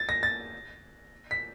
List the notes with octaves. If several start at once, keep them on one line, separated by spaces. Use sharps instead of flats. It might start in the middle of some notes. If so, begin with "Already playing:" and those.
Already playing: A6
A#6
A6
B6